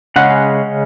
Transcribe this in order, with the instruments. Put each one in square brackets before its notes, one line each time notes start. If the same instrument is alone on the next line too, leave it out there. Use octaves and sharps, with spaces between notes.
[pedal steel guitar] C#3 G#3 C#4 F#5